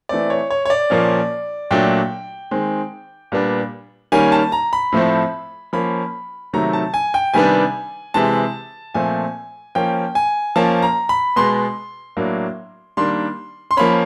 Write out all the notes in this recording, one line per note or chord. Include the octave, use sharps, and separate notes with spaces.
E3 A3 C4 D5
C#5
C#5
C#5
D5
A#2 F3 A#3 C#4
A#2 F#3 A3 D4 G5
D#3 G#3 C4
A#2 G3 B3 D4
D#3 G3 A#3 C#4 G#5
A5
A#5
B5
A2 F3 A3 C4
F3 A#3 C#4 B5
C3 D#3 F#3 A3 A#5
A5
G#5
G5
C3 D#3 G3 B3 D4 G#5
C3 E3 G#3 A5
A#2 F3 A3 C4 G#5
F3 A#3 C#4 G5
G#5
F3 A#3 C#4 A5
A#5
B5
B2 G#3 B3 C6
A2 F#3 A#3 D4
D#3 G3 A#3 D4 C6
C6
F3 A#3 C#4 B5